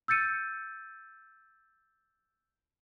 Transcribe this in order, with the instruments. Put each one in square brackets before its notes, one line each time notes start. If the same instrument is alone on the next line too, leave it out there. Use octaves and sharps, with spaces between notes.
[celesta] E6 G6 A6 C#7 D#7